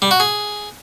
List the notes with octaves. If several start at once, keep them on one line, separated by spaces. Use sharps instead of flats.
G3
F#4
G#4